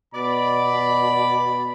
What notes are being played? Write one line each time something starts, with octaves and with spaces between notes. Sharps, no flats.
B2 D5 B5